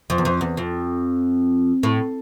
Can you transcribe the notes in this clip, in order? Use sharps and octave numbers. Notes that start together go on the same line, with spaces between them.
F2
E2
F2
E2
F2
A2